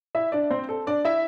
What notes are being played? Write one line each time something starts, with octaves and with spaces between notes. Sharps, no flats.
E4 E5
D4 D5
C4 C5
A4
D4 D5
E4 E5